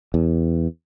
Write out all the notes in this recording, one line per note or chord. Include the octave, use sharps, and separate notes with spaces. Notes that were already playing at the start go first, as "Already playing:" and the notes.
E2